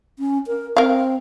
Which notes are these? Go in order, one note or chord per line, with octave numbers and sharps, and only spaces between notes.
C#4
A#4
C4 A#4 F5